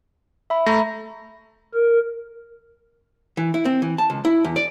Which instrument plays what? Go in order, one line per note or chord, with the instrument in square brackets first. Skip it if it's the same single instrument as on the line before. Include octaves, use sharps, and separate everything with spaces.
[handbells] E5 B5
[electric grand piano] A3 [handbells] A#5 B5 A#6
[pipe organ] A#4
[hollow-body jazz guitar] E3
E4
C4
E3
A5
C#2
E4
E2
D5